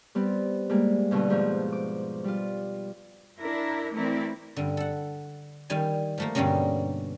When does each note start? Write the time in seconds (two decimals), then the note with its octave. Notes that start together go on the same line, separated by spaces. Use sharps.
0.15 G3 B3 C4
0.69 G3 G#3 A#3
1.11 G2 B2 D3
1.30 G#2 B2 F3
1.72 D6
2.24 G3 F4
3.38 D4 E4 A#4
3.93 E3 A3 C4 E4 A#4 D5
4.56 G2 D3
4.77 A4 F#5
5.70 D#3 G3 G#5
6.18 F3 A3 A#3
6.35 G2 B2 D3 G3 A#3 C#4